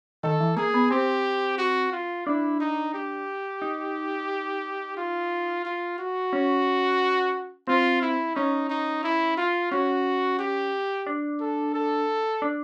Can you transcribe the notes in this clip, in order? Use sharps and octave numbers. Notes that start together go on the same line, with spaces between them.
D#3 A4
E3
A#3 G#4
B3
C4 G4
F#4
F4
D4 E4
D#4
G4
D#4
F4
F4
F#4
C#4
C4 F4
E4
C#4 D#4
D#4
E4
F4
C#4 F#4
G4
D4
A4
A4
D4